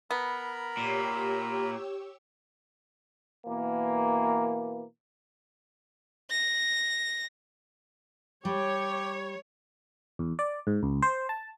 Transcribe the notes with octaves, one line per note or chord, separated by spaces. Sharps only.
B3 A#4 A#5 B5
A#2 G4 C#5 E6
B2 E3 A#3
A#6
G3 G4 C#5
E2
D5
G#2
C#2
C5
A5